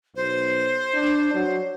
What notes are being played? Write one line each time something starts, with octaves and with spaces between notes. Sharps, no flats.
B1 C5
D4
F#3